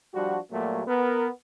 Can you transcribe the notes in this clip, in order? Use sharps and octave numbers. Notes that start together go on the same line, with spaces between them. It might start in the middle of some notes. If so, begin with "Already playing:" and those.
F3 G3 D4 F#4
A#2 F#3 G3 A3 A#3 F#4
B3 A#4